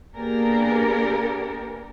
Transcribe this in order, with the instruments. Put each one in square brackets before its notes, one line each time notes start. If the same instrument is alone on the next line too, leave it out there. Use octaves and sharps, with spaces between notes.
[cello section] A#3 B3 D4 G4 G#4 A#4